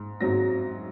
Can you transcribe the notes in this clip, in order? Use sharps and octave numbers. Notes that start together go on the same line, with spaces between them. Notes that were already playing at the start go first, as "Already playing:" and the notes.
Already playing: G#2
G#2 F#3 C4 A#6